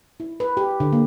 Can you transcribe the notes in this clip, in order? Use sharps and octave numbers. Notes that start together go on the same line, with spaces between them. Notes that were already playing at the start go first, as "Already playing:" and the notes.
E4
B4
G4
D3
A#3